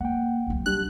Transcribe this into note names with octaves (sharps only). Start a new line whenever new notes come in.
A#3 F#5 G5
C2 F#3
G3 D4 G4 F#6